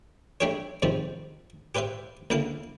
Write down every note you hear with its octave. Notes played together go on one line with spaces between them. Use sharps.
G3 A3 D4 G4 A4 C#5
G#2 C3 D#3 F3 G3
G4 B4 C5 E5 F5
C#2 D3 A#3 E4 A4 F5